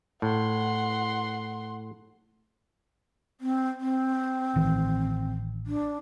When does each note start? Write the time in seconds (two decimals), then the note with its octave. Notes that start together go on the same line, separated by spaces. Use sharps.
0.22 A2 F#5 C6
3.41 C4
3.80 C4
4.56 A1 D#3 E3
5.67 D4